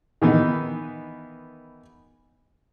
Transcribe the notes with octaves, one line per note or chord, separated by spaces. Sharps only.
D#3 E3 B3 D#4